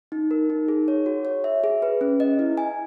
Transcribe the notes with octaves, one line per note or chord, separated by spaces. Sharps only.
D#4
A#4
D#4
G#4
C#5
F#4
C#5
E5
G#4
B4
C#4
D#5
E4
G#5